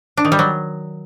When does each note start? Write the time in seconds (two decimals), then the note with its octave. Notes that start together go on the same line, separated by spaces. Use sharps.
0.17 D4
0.25 D#3
0.32 G3
0.39 F#3